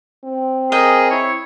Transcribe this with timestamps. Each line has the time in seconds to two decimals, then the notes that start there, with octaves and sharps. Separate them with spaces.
0.24 C4
0.72 G#4 A#4 D#5 G5
1.11 E4 C#5